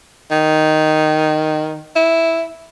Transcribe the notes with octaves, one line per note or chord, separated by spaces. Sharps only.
D#3
E4